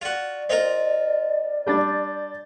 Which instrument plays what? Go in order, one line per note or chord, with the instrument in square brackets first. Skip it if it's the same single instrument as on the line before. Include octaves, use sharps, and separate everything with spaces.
[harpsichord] F4 F#4 [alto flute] D5
[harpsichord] C4 F4 A#4 [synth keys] D#5
[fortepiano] G3 D4 [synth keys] G6 A6